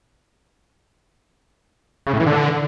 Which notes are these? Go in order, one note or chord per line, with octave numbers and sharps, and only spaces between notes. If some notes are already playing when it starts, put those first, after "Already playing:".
C#3
A2
E3
D3